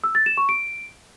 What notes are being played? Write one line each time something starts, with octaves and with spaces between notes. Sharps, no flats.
E6
A6
E7
C#6
D7